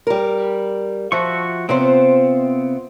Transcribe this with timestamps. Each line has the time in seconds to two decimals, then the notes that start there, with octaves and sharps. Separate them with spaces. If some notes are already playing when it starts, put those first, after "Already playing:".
0.07 G3 A#4
1.12 F3 F#4 E5 C#6
1.69 C3 B3 C4 F4 C5